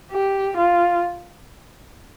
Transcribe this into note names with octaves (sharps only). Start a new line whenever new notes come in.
G4
F4